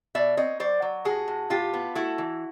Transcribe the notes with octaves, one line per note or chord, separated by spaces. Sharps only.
B2 D5 E5
C4 C#5 D#5
F#3 C5 D5
F#3
A2 F#4 G#4
A2
A2 F4 G4
B3
A3 E4 F#4
E3